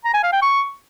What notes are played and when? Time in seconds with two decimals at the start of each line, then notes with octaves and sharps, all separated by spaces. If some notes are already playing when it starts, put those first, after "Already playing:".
0.05 A#5
0.14 G#5
0.23 F5
0.33 G5
0.42 C#6